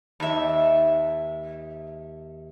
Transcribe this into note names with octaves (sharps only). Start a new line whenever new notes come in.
D#2 E5